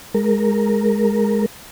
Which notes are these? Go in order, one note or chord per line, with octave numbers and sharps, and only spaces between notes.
G#3 A#4